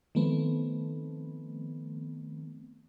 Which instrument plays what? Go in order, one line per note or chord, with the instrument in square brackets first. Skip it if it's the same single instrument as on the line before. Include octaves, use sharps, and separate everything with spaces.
[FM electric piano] D#3 F3 A3 B3 C4